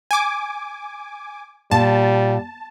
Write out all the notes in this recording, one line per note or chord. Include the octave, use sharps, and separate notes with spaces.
G#5 D6
A#2 G3 A5